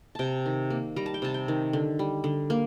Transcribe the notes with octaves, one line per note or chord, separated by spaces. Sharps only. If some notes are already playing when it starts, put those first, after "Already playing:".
C3 G5 A5
D#3
A#3
G3 A#5
A5
G5
C3 A5
G5
D#3
D3
G3
D3
A#3